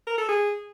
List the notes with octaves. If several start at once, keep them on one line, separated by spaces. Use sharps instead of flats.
A#4
A4
G#4